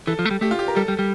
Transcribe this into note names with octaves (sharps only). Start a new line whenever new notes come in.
E3 A4
F3
A3
G3
A3 G4
F4
G4
A#4
G3 A4
G3
G3